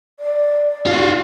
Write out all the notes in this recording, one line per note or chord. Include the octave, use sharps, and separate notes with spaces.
D5
F4 F#4